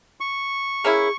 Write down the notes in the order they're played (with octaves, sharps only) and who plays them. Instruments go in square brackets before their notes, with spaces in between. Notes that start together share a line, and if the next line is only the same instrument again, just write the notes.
[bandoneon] C#6
[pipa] A#3 C#4 E4 [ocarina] G#4